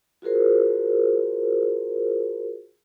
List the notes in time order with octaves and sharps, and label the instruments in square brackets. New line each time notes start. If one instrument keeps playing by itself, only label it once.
[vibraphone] F4 F#4 G#4 A#4 C5